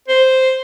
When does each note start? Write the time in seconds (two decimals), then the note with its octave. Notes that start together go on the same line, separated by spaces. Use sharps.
0.08 C5